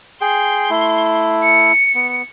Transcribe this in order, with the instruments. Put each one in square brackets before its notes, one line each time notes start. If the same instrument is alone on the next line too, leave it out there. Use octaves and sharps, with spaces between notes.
[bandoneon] G#4 G5 [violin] C6
[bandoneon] A3 E4
[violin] C#7
[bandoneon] B3